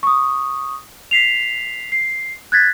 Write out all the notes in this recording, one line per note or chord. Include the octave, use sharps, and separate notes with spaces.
C#6 D#6
B6 C7 F7
C7
F#6 G#6 A6 B6